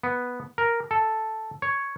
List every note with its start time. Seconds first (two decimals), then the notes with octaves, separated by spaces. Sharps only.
0.03 B3
0.58 A#4
0.91 A4
1.62 C#5